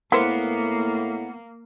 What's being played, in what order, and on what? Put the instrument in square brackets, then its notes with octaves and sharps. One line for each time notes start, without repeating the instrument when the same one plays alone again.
[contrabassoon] A2 [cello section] A#3 [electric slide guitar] B3 [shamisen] E4 A#4 C5